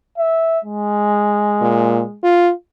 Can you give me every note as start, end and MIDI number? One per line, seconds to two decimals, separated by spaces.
0.18 0.59 76
0.65 2.19 56
1.61 2.02 46
2.23 2.52 65